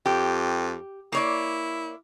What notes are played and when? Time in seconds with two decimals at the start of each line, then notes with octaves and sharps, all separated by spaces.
0.06 F2 G4
1.12 A#3 E4 C#5 D5